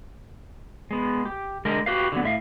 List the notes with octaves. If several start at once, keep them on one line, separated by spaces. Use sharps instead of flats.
G#3 B3
G4
D3 G#3 A#4
F#4 G4 B4 F5
D3 F#3 B3
A2 E5 F5